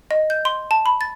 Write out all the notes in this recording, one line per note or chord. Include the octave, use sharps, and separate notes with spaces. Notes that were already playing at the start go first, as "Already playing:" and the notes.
D#5
G6
C6
A5
B5
A6